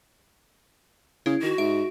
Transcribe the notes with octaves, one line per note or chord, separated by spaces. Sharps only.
C#3 E4
D#3 F#4
G#2 E5 D7